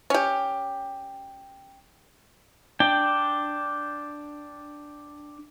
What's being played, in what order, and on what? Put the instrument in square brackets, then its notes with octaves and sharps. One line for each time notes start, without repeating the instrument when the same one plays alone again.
[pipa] C#4 G4
[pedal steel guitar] D4 G5